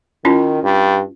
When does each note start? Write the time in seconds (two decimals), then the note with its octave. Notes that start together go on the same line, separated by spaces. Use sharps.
0.25 D#3 C#4 E4 F4
0.63 G2